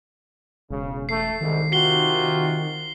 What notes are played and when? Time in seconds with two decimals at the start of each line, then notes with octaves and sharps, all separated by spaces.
0.70 E1 C#3
1.09 A3 C7
1.41 C2 G#2 D#3
1.72 C3 F4 F#4 C7 G7